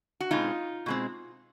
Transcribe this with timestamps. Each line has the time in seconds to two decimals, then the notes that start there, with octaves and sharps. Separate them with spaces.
0.20 F#4
0.31 B2 G#3 C4 D#4 F4
0.86 B2 G#3 C4